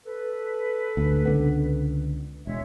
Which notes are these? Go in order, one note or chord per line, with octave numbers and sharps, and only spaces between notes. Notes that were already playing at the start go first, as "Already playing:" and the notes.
A4 B4
D2
C#2 D3 B3
E1 G#3 C#5 E5